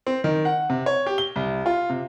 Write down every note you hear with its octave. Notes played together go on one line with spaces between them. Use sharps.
C4
D#3
F#5
C3
C#5
G4
G7
C2
F4
C3